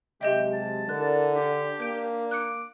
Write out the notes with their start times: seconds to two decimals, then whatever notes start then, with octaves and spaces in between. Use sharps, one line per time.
0.21 C3 F#3 G#3 G4 D#5 E5 G5
0.53 A5
0.89 D3 D4 E4 A#4 F#6
1.34 D4 G4
1.80 A#3 G6 D7
2.31 D6 F#6 C#7